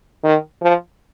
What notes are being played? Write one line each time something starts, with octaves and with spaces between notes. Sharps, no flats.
D#3
F3